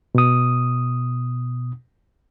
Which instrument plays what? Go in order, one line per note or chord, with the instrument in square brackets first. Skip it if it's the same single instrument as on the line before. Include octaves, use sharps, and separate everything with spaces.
[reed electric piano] B2 D#6